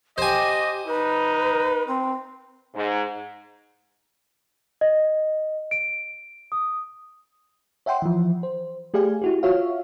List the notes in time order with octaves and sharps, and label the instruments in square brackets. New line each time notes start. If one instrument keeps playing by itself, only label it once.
[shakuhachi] G4 [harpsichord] C5 G#5 [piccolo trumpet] D#5
[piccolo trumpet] D#4 [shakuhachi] B4
[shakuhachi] C4
[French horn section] G#2
[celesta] D#5
D7
D#6
[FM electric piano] C#5 E5 F#5 G5 C6
E3 F3
C5
A3 G4 G#4 D5 F5 G#5
E4 F#4 G4
F4 F#4 C#5 E5 F5